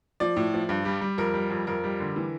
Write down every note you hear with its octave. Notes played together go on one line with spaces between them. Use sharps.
F3 D5
A2
F3
G2
G3
G3
F2 A#4
G3
F2
F2 A#4
G3
D3
E3